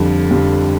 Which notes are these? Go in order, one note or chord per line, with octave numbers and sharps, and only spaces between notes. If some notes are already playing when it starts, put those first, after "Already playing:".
Already playing: F2 D3 G3
F2 D3 G3